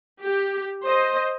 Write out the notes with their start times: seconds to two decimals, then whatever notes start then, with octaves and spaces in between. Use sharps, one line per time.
0.22 G4
0.84 C5 D#5